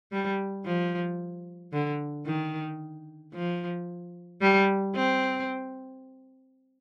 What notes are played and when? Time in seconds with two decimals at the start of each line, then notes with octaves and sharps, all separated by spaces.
0.12 G3
0.65 F3
1.73 D3
2.26 D#3
3.34 F3
4.41 G3
4.95 C4